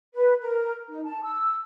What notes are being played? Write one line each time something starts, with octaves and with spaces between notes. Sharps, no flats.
B4
A#4
D#4
A5
E6